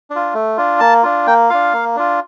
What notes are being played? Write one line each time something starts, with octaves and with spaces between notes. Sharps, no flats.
D4
F4
A3
D4 F4
A#3 A5
D4 F4
A#3 G5
D4 F4 F5
A#3
D4 F4